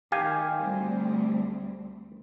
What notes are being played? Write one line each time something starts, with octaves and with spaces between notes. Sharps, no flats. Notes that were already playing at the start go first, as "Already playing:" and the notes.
D#3 G4 F5 G#5
D2 G3 C4